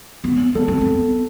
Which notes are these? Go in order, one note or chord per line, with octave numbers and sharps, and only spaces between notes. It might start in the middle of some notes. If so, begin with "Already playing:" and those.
B3
B3 A4
C4
B3